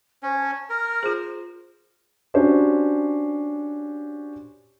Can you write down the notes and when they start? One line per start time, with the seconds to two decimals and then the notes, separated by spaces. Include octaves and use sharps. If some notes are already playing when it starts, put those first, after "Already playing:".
0.23 C#4 C5
0.38 A5
0.70 A#4 F6
1.03 F4 G#4 C5
2.34 C#4 D4 F#4 G4 C5 C#5